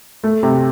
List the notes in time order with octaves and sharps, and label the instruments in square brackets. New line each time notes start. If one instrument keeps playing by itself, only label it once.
[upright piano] A3
C3